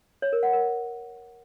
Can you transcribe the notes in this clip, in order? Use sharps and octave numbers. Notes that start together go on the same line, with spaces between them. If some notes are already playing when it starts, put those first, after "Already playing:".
C#5
A#4
F#5
A#4